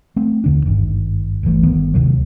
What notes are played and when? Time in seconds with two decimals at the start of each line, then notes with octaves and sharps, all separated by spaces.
0.16 A3 C4
0.44 D#2 D3 D4
0.66 G#1 G2 D#3
1.43 D1 G1 E3 A3
1.63 G1 D#3 B3
1.94 D2 C3 D#3 F#3